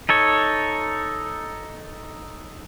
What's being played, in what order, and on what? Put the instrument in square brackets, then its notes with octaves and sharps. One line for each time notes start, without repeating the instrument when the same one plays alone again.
[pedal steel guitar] D#4 A4 C#5